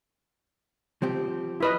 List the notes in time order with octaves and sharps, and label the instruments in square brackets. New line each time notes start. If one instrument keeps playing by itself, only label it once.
[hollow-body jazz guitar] F3 C4 G4
[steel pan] E4 B4 D#5